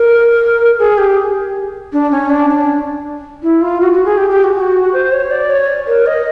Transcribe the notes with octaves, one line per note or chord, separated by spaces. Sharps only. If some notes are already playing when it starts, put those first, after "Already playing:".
Already playing: A#4
G#4
G4
D4
C#4
D4
D4
E4
F4
F#4
F#4
G#4
G4
G4
F#4
G4
F#4
C5
C#5
D5
C#5
A#4
D#5